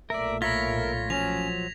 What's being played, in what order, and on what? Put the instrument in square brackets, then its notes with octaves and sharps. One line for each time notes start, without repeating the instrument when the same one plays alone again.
[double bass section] B1 A#2 A3 [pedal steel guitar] A#4 D5 [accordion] E5
[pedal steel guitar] F4 C#5 B5 [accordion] A#4 E5 [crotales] G#6 A#6 B6
[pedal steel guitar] F3 F#3 [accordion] C#4 [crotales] F7